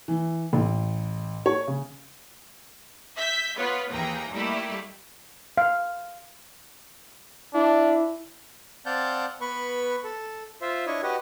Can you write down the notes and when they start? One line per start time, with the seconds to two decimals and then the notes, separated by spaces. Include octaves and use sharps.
0.08 E3
0.53 A1
1.46 C#5
1.67 C#3
3.17 E5 G6 B6
3.58 B3 F4 B4 C#5
3.92 D#2 E3 A#3 G#4 G5 A#5
4.33 G3 A3 A#3 D#4 E4 G4
5.58 F5
7.54 D4 E4
8.86 C4 D5 F5 F#5 A5 G6
9.41 B3 B4 B5 C#6
10.04 A4
10.62 F4 C5 E5
10.87 D4 E4 C#5 D#5
11.03 F#4 G4 B4 D#5 F#5